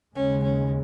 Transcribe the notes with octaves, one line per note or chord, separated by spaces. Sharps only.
D#2 C#3 G#3 C#4
C#4